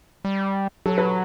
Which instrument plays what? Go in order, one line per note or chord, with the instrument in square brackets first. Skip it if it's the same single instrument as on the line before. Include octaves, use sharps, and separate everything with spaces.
[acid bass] G3
[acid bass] F#3 [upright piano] A4
[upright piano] B4